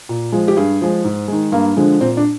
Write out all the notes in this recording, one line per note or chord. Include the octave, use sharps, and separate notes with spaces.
A#2
F3 G#3
G4
G2 G#4
F3 G#3
G#2
D#3 G#3
G2 A#3
D3 F3 G#3
A#2 C4
D4